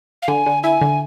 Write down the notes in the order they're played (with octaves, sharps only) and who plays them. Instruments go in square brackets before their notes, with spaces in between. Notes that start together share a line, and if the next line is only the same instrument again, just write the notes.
[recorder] F5
[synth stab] D3 [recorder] G#5
[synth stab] D3
[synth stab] E4 [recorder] G#5
[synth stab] D3